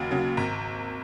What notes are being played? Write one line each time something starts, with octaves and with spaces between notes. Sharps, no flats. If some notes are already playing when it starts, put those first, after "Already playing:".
Already playing: D#2 C#3 F#3
C#3 F#3
G#1 A#5